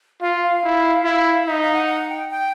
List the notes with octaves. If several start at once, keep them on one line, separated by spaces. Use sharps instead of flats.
F4 F5
F5
E4
E4
D#4 E5
F5
F#5
F#5
G5
G5